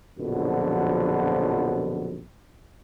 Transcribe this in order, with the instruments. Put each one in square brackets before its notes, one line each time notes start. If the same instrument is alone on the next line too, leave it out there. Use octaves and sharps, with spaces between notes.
[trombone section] A#1 F#2 B2 D3 F3